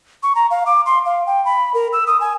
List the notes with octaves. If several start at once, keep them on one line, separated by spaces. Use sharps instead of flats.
C#6
A#5
F5
D6
C6
F5
G5
B5
A#4
E6
D#6
G#5